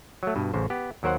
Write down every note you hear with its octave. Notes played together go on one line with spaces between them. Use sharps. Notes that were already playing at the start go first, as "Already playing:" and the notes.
F#3 A3
G2 B2
A1 C#3 C5
B3 G4
D#2 F#3 A#4 C5 F#5